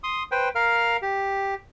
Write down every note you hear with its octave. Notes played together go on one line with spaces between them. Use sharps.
C6 D#6
B4 C5 G5
A#4 F5 F6
G4